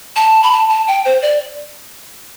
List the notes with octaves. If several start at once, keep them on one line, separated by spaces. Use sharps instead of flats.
A5
B5
A5
A5
G5
C5
D5